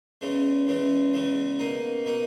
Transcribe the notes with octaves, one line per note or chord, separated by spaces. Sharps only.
E2 C#3 E3 G#3
E2 C#3 E3 G#3
E2 C#3 E3 G#3
B2 A#3 D#4
B2 A#3 D#4